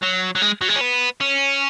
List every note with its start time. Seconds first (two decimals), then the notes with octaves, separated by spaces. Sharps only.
0.03 F#3
0.36 F#3
0.42 G#3
0.61 F#3
0.68 G#3
0.76 C#4
0.81 B3
1.21 C#4